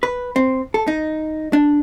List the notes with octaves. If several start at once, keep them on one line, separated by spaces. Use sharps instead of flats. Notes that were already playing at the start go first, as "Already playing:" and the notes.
B4
C4
A4
D#4
D4